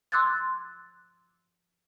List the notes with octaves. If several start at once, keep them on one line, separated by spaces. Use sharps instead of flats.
C6 D6 E6 F#6 G#6 A6